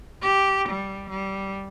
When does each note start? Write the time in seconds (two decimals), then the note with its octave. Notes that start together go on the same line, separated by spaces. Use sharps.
0.22 G4
0.70 G3
1.10 G3